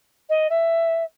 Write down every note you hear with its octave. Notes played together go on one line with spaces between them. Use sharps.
D#5
E5